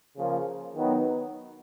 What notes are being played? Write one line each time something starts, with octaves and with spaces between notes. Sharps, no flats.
C#3 F3 A#3
D#3 F#3 B3 D#4